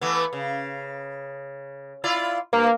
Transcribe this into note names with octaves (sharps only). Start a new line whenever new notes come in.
E3 A3 B3
C#3
E4 F4 D5
G2 A#3